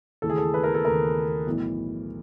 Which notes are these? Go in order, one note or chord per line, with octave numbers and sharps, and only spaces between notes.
D#2 C#3 E3 A3 A4
G#4
A4
B4
A#4
A4
D#2 C#3 E3 A3 A#4
B1 A2 E3